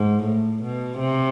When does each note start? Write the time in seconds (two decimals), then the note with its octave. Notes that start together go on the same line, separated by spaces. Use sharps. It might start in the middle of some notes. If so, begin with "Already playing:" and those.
Already playing: G#2
0.24 A2
0.63 B2
1.00 C3